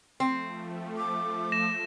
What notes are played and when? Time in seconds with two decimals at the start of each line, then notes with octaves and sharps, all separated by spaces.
0.20 F3 A3 C4
0.97 D6
1.52 A#6 E7